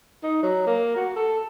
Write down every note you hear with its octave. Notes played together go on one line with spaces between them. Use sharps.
D#4
F#3
A#3
F#4
A4